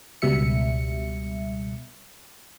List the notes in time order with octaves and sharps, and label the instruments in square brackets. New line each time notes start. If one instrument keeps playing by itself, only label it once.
[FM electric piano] C#2 B2 G3 E5 C#7